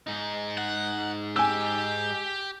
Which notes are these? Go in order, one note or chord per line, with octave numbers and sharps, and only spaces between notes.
G#2 D#4
F#5
G4 G#5 E6